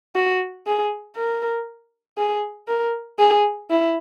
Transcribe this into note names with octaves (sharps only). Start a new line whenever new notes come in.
F#4
G#4
A#4
G#4
A#4
G#4
E4